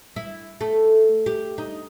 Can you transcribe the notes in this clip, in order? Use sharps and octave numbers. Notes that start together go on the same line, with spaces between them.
E4
A3
G4
D#4